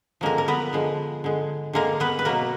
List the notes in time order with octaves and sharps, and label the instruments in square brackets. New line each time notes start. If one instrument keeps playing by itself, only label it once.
[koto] D3 F3 G#3 A#3 A#4
A#4
B3 B4
D3 F3 G#3
D3 G#3
D3 G#3 A#3 A#4
B3 B4
B4
B2 F#3 A#3 A#4